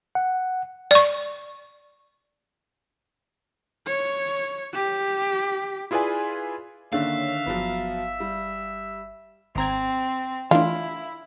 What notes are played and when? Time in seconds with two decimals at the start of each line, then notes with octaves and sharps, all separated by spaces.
0.15 F#5
0.91 D5 C#6
3.87 C#5
4.74 G4
5.91 E4 F4 G#4 B4 D5 G#5
6.93 D3 D#3 A#3 C#4 D4 C#5 E5 F5
7.46 G1 F3 F#3 B3
8.20 G3
9.56 G#1 C4 A#5 G#6
10.51 E3 A3 D4 E4 F4